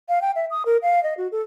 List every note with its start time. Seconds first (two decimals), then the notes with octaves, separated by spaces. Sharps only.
0.09 F5
0.22 G5
0.36 E5
0.51 D#6
0.66 A#4
0.82 F5
1.03 D#5
1.18 F#4
1.32 A4